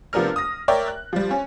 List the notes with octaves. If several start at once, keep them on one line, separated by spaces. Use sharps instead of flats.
C3 F3 B3 D4 A#4 F6
D#6 A#6
A#4 C#5 D5 E5 G5
F#6
F3 G3
C#4